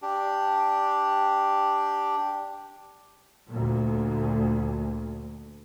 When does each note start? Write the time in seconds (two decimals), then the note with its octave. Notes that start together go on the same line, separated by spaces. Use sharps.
0.02 D4 G4
3.50 D2 A#2